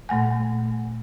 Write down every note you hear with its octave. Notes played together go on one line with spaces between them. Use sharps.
A#2 A3 F#5 G#5